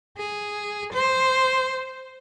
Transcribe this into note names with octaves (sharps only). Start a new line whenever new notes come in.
G#4
C5